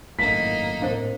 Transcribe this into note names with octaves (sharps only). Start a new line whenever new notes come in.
G#1 F#2 A2 A#3 D#4 B6
A2 C4 D4 A#4 C5 F5